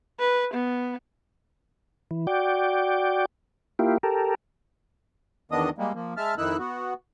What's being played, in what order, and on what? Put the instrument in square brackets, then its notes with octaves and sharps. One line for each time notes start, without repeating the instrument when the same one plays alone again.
[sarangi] B4
B3
[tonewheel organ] E3
F#4 D5 G5
A#3 E4 F4 G4
G4 A4 A#4
[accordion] E2 D#3 B3 D4 D#5 D#6
G3 G#3 A#3
F3 A#3
G#3 E5 A5 F6
F2 D#3 D#4 E4 E6 F#6
B3 F#4